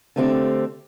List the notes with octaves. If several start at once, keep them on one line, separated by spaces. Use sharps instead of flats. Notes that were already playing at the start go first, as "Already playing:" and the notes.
D3 A3 C4 G4